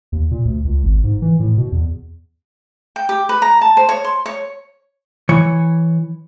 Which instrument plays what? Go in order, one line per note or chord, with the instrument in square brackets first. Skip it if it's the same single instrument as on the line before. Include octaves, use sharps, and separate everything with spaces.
[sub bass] D#2
A#2
D2
C#2
G#1
G#2
E3
A2
B2
E2
[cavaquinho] G5
G4
B4
A#5
A5
C5
C#5
C6
C#5
[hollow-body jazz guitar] E3 C#5